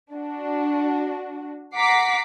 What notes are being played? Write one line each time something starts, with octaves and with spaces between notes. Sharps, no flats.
D4 F#4
F#5 A#5 D6 B6 C7